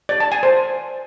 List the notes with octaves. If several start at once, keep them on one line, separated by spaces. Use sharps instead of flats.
D5
A5
G#5
C5